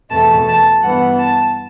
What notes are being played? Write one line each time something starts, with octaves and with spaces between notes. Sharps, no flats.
E2 B2 A3 A5
A5
G2 E3 B3 F#5
A5